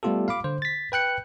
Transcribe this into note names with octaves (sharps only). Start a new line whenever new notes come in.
G3 A3 B3 F4 G4 A4
F5 B5 D6
D3 C5
A6 B6
B4 G5 F#6 C#7